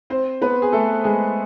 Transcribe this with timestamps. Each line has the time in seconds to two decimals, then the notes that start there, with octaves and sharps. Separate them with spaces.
0.10 C4 C5
0.42 B3 B4
0.62 G#4
0.73 A3 A4
1.04 G#3 G#4